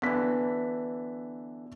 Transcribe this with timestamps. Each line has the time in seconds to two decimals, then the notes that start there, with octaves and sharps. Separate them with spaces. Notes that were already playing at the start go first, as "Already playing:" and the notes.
0.02 D3 E3 B3 B6